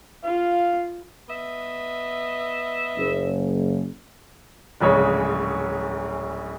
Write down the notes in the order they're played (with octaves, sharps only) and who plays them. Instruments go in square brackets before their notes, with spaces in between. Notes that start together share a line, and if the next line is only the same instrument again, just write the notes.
[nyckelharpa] F4 [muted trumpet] F5
[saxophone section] B3 D#5 E5
[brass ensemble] F#1
[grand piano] D1 A#1 C#3 G#3 C#5